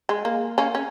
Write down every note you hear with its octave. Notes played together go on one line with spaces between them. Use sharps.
G#3
A#3
A#3 C#4
C#4